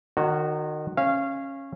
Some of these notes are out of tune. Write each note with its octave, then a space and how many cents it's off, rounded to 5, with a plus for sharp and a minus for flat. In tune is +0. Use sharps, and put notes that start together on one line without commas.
D#3 -30 F#4 +0 C#5 +0
C#4 -15 F5 -20